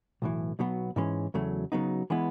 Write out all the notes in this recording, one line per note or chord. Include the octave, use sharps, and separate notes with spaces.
B1 A2 E3
B1 B2 F#3 B3
G#2 E3 G#3 C#4
E2 C#3 F#3 A3
C#3 F#3 B3 D#4
E3 G#3 B3 E4